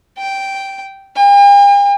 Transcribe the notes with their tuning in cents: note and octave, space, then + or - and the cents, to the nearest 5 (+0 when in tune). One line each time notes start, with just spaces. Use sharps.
G5 -5
G5 +45